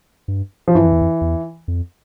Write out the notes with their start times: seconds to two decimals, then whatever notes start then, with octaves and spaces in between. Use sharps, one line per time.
0.28 G2
0.68 F3
0.75 G2 E3
0.84 F2
0.93 E2
1.02 F2
1.21 E2
1.68 F2